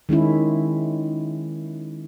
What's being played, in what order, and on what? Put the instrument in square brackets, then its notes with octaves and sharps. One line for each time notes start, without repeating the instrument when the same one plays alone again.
[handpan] D#3 G#3 C#4 E4